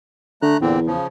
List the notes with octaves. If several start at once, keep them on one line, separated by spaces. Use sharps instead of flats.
D3 A3 A#5 F#6
E2 A#2 D3 C4
C#3 F3